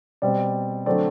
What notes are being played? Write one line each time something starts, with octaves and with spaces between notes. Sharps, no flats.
B2 G3 C4 D5
D3 F#3 A3 C4 D5